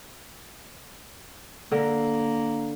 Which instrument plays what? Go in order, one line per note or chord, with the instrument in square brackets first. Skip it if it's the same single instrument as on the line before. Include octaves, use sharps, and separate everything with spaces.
[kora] D3 A#4 [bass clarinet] A#3